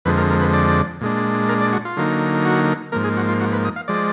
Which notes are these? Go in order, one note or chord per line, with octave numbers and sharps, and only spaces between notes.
F2 D3 F3 G#3 B4
A#4
A#4
B4
D5
A#2 G#3 D4
A#4
D5
F#4
F4
D3 F#3 A#3 D#4
F#4
G#2 F3 A#3 A#4
G#4
F#4
F4
F#4
B4
D#5
F5
F3 G#3 D5